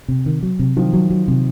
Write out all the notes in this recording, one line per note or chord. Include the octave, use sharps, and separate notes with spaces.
C3
D#3
F#3
C3
D#3 F3 F#3
F#3
F#3
C3